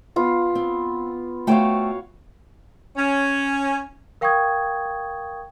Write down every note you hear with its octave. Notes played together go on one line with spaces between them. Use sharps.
B3 F4
C4
A3 F#4 C5 C#5 F5 G5
C#4
A#4 F5 G5 C#6 D#6 G#6